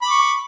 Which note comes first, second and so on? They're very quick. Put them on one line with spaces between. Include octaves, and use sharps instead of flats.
B5 D6 C#6